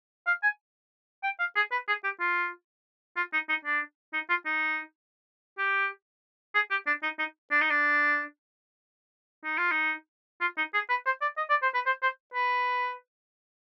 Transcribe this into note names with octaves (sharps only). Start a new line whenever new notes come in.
F5
G#5
G5
F5
G#4
B4
G#4
G4
F4
F4
D#4
D#4
D4
D#4
F4
D#4
G4
G#4
G4
D4
D#4
D#4
D4
D#4
D4
D#4
F4
D#4
F4
D#4
G#4
B4
C5
D5
D#5
D5
C5
B4
C5
C5
B4